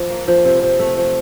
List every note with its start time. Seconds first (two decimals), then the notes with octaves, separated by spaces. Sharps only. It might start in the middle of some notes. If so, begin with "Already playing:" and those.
Already playing: F3
0.10 A#3
0.28 F3
0.45 C3
0.63 C3
0.79 A3
0.97 F3